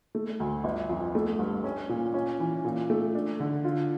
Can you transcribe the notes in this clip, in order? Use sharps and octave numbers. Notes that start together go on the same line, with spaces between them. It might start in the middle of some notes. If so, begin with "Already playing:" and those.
A3
D2
G1
F2
A3
G2
C#4
A#2
C#4
E3
A#2
A3
D4
D3
F4